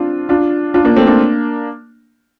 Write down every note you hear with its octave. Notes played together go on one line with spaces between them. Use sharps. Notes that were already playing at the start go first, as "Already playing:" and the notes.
Already playing: C4 D4 F4
D4 F4
D4 F4
A#3 D4
A3 C4
A#3 D4